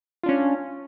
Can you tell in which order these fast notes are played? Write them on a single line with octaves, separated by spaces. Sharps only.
F4 D4 C#4